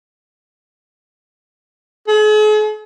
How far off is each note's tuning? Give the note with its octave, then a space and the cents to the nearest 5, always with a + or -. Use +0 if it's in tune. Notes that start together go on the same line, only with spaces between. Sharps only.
G#4 +45